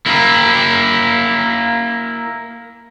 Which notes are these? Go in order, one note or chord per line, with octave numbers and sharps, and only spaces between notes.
A#3 E4